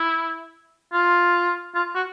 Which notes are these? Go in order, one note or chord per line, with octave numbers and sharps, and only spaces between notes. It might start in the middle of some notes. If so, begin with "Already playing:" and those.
Already playing: E4
F4
F4
F#4